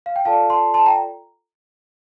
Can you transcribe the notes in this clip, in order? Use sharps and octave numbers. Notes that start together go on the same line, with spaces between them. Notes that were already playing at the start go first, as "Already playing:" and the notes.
F5
G5
F4 A4 D5 F5 A5
A5 C6
A5 C6
G5 A#5